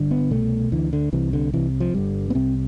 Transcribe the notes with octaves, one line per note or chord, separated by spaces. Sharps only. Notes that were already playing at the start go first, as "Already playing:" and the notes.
Already playing: G1 G2 D3
B3
C2 B2 A3
D2 D3 E3
D3
C2 C3 E3
D3
C2 C3 E3
F3
G1 G2 D3 G3
B3
C2 C3 C4